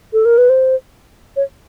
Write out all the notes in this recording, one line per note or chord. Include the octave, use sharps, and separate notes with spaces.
A4
A#4
B4
C5
C#5